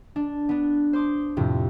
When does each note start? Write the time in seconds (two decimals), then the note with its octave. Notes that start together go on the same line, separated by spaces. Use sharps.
0.16 D4
0.49 B3 D4
0.93 C5 C6 D6 D#6
1.37 F2 A2 C3